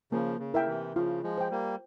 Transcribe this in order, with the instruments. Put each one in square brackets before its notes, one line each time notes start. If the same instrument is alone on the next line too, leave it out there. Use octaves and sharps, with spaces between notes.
[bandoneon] C#3 F3 [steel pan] A#3
[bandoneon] C#3
[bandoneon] C#3 [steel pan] E4 A#4 E5 G5
[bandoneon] C3 E3
[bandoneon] C#3 F3 [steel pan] F4
[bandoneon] F3 G#3
[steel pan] C5 G5
[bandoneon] G3 A#3